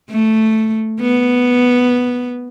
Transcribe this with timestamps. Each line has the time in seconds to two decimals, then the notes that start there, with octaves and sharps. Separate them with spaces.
0.11 A3
1.01 B3